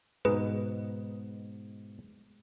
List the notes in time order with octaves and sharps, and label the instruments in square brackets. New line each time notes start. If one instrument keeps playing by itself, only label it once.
[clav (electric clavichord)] G#2 B2 D#4 [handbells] G#4 B4